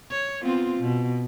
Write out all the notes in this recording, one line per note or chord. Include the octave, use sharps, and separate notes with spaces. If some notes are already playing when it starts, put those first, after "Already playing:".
C#5
B3 C4 F4
B2